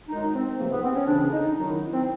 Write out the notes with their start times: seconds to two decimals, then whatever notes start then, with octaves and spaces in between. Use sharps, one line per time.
0.08 F#2 D#3 G#3 D#4
0.33 C4
0.58 C#2 C3 F3 A3 A#3
0.71 B3
0.82 C4
0.95 C#4
1.06 D2 C#3 E3 D4
1.31 D#4
1.56 F#2 D#3 F#3 D#4
1.68 E4
1.93 C4